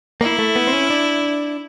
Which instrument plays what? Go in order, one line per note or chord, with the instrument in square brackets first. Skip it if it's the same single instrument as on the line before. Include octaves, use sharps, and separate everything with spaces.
[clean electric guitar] A#3 [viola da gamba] E4
[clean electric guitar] A3
B3
C4
C#4
D4